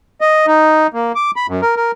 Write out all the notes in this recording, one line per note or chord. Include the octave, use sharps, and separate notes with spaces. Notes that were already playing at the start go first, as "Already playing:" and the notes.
D#5
D#4
A#3
D6
B5
F#2
A#4
A#4